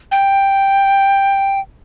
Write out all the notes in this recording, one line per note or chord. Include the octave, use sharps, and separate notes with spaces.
G5